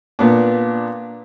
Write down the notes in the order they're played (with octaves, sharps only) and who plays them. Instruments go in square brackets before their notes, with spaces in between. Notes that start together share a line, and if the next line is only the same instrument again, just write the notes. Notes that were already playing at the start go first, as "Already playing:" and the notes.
[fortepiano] A#2 B3 D4